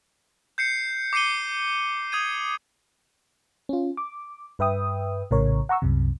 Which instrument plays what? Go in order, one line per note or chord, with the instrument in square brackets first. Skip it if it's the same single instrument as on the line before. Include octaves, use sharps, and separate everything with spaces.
[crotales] G6 C7 C#7
D6 C7 C#7 D#7 G7
D#6 G#6 D#7
[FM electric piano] C#4 F4
D6
G2 B4 E5 G5 D#6
A#1 A2 C#3 A#4 C#5
F#5 A#5 C#6 E6
C2 F#2 C3